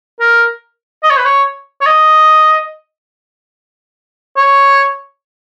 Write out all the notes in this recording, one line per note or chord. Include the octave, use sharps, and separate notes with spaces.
A#4
D#5
C#5
B4
C#5
C#5
D#5
C#5